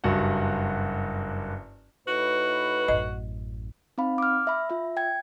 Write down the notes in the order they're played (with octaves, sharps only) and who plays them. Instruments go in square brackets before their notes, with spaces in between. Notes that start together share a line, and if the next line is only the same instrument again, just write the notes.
[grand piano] F#1 G2 F#4 F#5
[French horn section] A2 D#4 B4 [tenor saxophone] F#4
[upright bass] A1 F#2 [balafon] D#5
[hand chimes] C4 D#4 F5 B5
D6 F6
E5 B5
F4 E5
G5 G#6